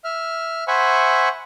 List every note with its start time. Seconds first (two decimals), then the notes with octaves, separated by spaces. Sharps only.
0.04 E5 F6
0.68 C5 E5 F#5 G#5 B5 C#6